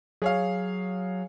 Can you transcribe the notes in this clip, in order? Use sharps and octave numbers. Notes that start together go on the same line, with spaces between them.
F#3 G#4 C#5 F5